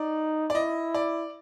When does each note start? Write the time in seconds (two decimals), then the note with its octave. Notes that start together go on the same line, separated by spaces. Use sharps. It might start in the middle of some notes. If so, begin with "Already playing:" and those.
Already playing: D#4 D5
0.50 D5
0.55 E4 D#5
0.94 D5